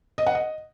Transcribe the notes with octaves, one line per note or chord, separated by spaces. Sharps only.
D#5
F#5
D#5